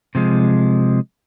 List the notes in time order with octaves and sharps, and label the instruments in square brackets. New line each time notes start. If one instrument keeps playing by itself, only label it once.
[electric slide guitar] C3 F3 G#3